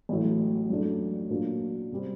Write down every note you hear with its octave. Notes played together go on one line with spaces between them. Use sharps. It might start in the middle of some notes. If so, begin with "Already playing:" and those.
A1 A2 F#3 A3
F#2 F#3 A3 D4 A4
A#2 F#3 A#3 D4
C3 G3 C4